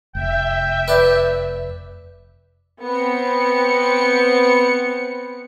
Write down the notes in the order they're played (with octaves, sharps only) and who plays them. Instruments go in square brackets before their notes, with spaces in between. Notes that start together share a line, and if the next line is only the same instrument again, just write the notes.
[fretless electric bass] F1 [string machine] E5 [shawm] G5
[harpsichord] B4 D5
[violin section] B3 C4 C#7